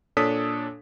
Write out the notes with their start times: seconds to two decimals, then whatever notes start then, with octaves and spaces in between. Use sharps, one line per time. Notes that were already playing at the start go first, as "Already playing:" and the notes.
0.17 A#2 D4 A4 C#5 D#6 B6